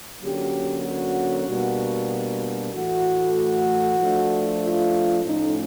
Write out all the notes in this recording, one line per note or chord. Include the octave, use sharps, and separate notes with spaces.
D3 F#3 A#3 C#4 G4
F#4
B2 G3 A#3 D4
A2 E3 A3 F#4
F3 A3 D4
F4
A2 F3 A3 C#4 D#4